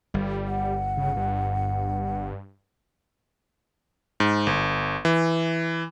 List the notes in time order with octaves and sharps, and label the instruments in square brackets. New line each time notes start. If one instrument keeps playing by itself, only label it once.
[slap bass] G1 [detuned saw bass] G3
[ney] F#5
[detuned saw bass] C#3
G2
[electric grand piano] G#2
G1
E3